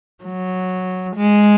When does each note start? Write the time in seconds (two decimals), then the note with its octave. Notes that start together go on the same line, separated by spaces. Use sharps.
0.25 F#3
1.16 G#3